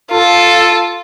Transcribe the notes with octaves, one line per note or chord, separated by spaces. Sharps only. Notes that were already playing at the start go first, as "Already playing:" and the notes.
F4 A4